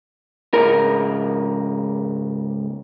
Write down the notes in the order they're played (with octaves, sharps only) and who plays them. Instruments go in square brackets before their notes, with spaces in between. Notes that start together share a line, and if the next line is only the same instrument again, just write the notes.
[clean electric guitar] C#2 G#2 A#4